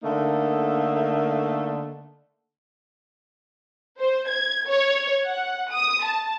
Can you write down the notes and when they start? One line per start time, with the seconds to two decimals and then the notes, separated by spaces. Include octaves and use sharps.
0.04 D3 A3 A#3 D#4
4.00 C5
4.29 G#6
4.68 C#5
5.25 F#5
5.70 D#6
6.03 A5